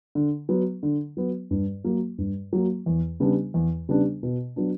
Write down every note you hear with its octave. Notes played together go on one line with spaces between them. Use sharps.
D3
F#3 B3
D3
F#3 B3
G2
F#3 A#3
G2
F#3 A#3
E2
C#3 G3 B3 D4
E2
C#3 G3 B3 D4
B2
F#3 B3 D4